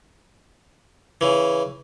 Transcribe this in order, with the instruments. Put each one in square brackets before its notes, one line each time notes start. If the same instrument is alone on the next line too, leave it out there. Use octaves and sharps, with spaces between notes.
[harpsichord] C#3 E3